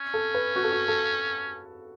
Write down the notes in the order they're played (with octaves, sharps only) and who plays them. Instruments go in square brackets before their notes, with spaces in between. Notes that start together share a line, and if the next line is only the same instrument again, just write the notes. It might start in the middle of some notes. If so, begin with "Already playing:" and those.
Already playing: [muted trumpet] C#4
[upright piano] A4
B4
F#4
A4
F#4
A4